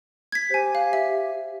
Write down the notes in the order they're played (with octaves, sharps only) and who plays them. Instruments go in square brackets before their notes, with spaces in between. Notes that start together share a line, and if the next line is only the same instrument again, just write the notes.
[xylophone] G#6 B6
[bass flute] G4 [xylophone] C5 G#5
[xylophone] F5
E5